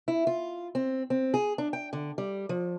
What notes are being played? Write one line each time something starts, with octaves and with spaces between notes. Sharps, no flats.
E4
F4
C4
C4
G#4
D4
G5
D3
G3
F3